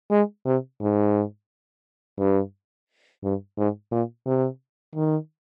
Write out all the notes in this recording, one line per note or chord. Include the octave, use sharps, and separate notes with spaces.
G#3
C3
G#2
G2
G2
G#2
A#2
C3
D#3